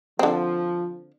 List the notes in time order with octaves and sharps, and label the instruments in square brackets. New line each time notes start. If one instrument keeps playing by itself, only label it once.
[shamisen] D3 C4 [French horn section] F3